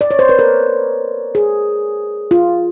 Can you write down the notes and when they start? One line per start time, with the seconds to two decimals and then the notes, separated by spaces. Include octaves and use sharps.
0.01 D5
0.11 C#5
0.19 C5
0.29 B4
0.39 A#4
1.35 G#4
2.31 F4